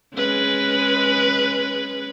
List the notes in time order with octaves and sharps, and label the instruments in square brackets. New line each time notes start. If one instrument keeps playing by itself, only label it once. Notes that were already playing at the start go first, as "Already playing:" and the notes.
[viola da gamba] G#3 C#4 B4